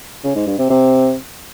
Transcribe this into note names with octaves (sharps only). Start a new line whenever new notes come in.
C#3
G#2
G2
C3
C3